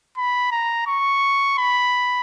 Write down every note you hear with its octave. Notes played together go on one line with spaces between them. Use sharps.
B5
A#5
C#6
B5